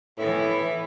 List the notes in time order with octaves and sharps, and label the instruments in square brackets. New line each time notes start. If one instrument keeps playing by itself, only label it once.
[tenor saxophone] A2 [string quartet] E3 B3 E4